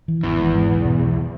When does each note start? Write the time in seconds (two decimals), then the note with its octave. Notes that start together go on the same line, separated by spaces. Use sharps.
0.08 E3
0.23 G#1 E2
0.39 G#2
0.54 G#2
0.70 B1
0.86 B2
1.01 B1